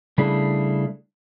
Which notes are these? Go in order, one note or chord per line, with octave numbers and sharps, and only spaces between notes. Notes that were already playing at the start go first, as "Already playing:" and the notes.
C#3 G3 A3 D4 E4 G#4